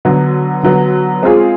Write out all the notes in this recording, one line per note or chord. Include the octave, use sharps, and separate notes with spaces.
D3 F#3 B3
D3 F#3 B3
G#3 C4 F4 G#4